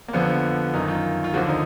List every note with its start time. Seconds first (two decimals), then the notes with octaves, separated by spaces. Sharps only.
0.08 A#3
0.13 F2 D3 F3 B3
0.73 F#2 D#3 D#4
0.88 F4
1.24 F4
1.34 D#2 D3 F3 F#4
1.49 D#4